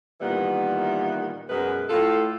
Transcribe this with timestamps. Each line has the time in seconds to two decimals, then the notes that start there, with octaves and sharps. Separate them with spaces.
0.21 A#2 D#3 E3 G3 B3
1.49 F#2 B2 G#3 A#4 B4
1.88 A2 F4 A4